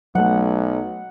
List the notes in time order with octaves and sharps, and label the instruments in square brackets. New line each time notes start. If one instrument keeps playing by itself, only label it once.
[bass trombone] B1 [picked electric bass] F#3 A3 [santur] F#5